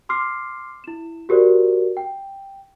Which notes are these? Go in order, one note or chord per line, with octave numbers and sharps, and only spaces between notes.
C6 D6 F6 C7
E4 E7
F#4 G4 A#4 C5 D5
G5